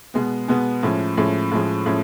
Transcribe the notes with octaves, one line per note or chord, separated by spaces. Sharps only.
B2 G#3 B3
B2 G#3 B3
A2 F3 G#3 C#4
A2 F3 G#3 C#4
A2 F3 G#3 C#4
A2 F3 G#3 C#4